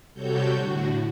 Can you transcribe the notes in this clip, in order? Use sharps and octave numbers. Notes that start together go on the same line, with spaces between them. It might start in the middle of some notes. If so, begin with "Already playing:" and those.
C3 G3 F#4 A4 C#5 G6
A2 D3 F#4